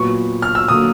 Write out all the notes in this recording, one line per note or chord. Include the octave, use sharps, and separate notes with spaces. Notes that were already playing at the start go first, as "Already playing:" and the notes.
Already playing: A#2 F#3 B3 C#6
F6
E6
D3 F#3 A#3 D#6